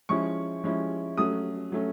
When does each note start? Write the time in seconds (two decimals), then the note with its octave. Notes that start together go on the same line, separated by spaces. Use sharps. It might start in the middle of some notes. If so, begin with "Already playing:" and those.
0.09 F3 G#3 C#4 E4 C#6
0.64 F3 G#3 C#4 E4
1.17 F#3 A3 C#4 D#6
1.72 F#3 A3 C#4